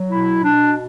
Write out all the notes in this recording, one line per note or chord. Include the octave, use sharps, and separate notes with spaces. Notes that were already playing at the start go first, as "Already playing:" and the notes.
Already playing: F#3
B2 E4
B2 D4